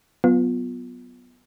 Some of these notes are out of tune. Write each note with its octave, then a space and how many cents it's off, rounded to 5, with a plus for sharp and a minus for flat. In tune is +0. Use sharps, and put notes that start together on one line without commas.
F#3 +0 B3 +0 F4 +10